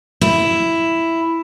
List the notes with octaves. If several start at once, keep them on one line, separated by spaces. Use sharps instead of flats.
E4